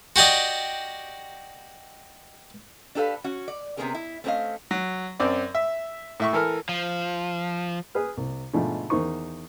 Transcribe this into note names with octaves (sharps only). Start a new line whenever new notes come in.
F#4 G4 D5 D#5
D4 G4 A4 B4 F5
C#4 F#4
D5
C3 F3 B3 C#4 G#4 A#4
E4
A3 C4 C#4 A#4 D#5 F5
F#3
F#2 C4 D5
E5
A2 E5 C#6
E3 A4 A#4 F6
F3
G#4 B4 F6
C2
G#2 B2 D3 F3 A3
E2 D#3 D#4 C5 C#6